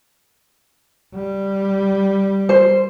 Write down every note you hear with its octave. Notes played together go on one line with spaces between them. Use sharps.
G3
C5